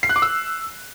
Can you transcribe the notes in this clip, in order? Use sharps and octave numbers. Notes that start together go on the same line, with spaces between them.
C7
F#6
D6
E6